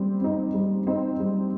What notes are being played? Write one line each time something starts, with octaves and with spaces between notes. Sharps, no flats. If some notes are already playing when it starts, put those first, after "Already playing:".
Already playing: G3 C4
C4 D#4
G3
C4 D#4
G3